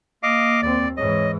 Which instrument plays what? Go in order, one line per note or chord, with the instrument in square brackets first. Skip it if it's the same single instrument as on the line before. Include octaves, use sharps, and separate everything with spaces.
[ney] A#3 [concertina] D#5 F5 D6
[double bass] D#2 C4 [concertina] D5
[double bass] G#2 E3 [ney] C#5 [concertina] D#5